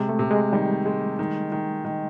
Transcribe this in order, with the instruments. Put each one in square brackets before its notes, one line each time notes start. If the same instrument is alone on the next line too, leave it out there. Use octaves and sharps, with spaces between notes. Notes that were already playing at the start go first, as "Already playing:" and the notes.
Already playing: [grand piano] C3 [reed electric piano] G#3
[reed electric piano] A3
[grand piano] C3
[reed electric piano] G#3
[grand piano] D#3 [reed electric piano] G3
[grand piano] G#3
D#3
D#3
D#3